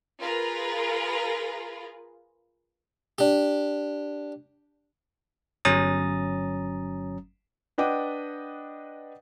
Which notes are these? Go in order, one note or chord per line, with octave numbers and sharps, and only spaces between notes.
F4 G#4 A#4 B4
D4 G4
G1 F#3 C#4 A#5 D#6 A6
D4 B4 D#5 F#5 G5 D6